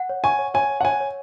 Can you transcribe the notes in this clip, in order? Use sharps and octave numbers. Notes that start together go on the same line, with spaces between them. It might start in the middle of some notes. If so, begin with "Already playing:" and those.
Already playing: F#5
C#5
G#5 C#6
C#5
C#5 G#5
C#5
F#5
C#5 G#5
C#5